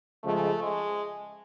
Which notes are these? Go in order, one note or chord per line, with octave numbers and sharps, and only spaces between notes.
C#3 F3 G#3 A3
G#3